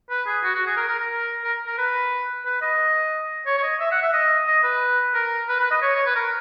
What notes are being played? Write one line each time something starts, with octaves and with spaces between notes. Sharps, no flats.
B4
G#4
F#4
F#4
G#4
A#4
A#4
A#4
A#4
A#4
B4
B4
D#5
C#5
C#5
D#5
E5
F#5
E5
D#5
D#5
B4
A#4
B4
B4
D#5
C#5
C#5
B4
A#4